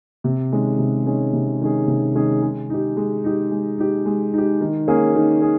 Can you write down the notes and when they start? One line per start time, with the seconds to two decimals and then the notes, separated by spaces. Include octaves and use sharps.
0.24 C3
0.52 D#3 G#3 C#4 G#4
0.79 C3
1.06 D#3 G#3 C#4 G#4
1.33 C3
1.61 D#3 G#3 C#4 G#4
1.88 C3
2.15 D#3 G#3 C#4 G#4
2.42 G#3
2.70 D#4 G4
2.97 G#3
3.24 D#4 G4
3.51 G#3
3.78 D#4 G4
4.06 G#3
4.33 D#4 G4
4.61 D#3
4.88 A#3 C#4 G#4
5.15 D#3
5.42 G#4